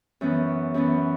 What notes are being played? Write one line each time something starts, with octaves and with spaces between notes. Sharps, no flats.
F#2 E3 B3
F#2 E3 B3